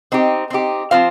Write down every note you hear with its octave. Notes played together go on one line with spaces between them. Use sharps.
C4 D#4 G4
C4 D#4 G4
F3 C4 F4 C5 F5